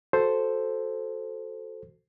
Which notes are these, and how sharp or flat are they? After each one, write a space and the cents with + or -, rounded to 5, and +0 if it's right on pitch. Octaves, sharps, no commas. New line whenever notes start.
F#4 +0 A4 +0 C5 +0